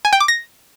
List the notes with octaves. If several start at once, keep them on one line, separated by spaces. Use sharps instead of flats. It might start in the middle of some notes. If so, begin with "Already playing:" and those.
G#5
G5
D6
A#6